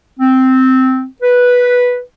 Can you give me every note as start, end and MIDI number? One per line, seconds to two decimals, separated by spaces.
0.20 1.05 60
1.22 2.00 71